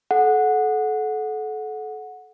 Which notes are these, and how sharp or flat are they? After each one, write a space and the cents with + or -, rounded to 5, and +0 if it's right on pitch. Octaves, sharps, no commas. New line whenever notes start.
A4 -30 F#5 -15